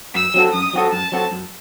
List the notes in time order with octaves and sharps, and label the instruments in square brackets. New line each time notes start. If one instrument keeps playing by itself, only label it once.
[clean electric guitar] F#2 [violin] E6
[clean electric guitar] F#3 C4 F#4 A4
[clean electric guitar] F#2 [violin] D#6
[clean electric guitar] F#3 C4 F#4 A4
[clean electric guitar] F#2 [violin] A5
[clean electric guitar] F#3 C4 F#4 A4
F#2